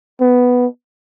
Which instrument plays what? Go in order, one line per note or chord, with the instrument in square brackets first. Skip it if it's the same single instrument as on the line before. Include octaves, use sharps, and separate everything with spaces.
[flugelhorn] B3